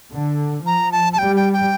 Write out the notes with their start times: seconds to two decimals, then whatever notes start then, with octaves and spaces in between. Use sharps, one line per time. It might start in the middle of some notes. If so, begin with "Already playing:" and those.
0.14 D3
0.66 F3 A#5
0.92 A5
1.13 A5
1.18 G3 G5
1.36 G5
1.53 G5